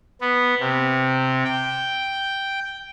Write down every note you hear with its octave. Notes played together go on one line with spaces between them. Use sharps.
B3
C3
G5